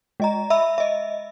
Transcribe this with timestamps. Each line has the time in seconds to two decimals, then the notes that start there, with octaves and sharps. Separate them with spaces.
0.20 G#3 D#5 A#5
0.50 E5 B5 E6
0.78 D#5 E5